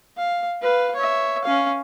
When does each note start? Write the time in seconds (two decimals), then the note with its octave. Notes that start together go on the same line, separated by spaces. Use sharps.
0.18 F5
0.62 B4 F5
0.95 C#5 E5
1.44 C#4 F5